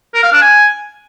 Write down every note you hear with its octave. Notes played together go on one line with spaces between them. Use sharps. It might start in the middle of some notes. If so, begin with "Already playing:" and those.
A#4
F5
D4
G#5